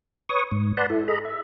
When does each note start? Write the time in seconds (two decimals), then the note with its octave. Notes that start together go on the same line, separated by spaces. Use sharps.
0.29 B4 C#5 C#6 D#6
0.52 G#2
0.77 B4 D5 F#5 A5 B5 C6
0.90 E4 A4
1.08 G#4 A4 D#5 A#5 B5
1.25 E5